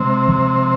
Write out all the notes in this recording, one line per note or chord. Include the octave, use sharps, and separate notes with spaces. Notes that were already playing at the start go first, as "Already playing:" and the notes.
Already playing: C3 G#3
F3